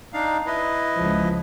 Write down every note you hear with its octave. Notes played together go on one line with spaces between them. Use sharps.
D4 D#4 F5
E4 B4 D#5
C#2 F3